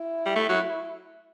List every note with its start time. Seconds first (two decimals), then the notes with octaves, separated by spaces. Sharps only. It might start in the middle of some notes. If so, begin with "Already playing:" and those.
Already playing: E4
0.26 G3
0.36 A3
0.49 F#3